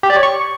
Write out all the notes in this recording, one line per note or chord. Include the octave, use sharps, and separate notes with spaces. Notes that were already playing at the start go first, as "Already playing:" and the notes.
G4
D5
C#5
C#6